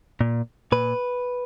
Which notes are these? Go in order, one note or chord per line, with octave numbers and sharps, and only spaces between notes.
A#2
A#2 B4